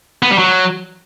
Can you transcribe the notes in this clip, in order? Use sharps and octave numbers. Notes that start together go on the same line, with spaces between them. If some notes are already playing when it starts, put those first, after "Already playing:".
B3
G3
F#3